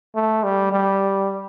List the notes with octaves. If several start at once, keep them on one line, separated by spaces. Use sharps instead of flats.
A3
G3
G3